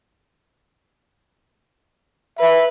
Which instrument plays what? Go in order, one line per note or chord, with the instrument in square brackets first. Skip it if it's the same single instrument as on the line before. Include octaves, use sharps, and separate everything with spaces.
[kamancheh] B4 [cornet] E5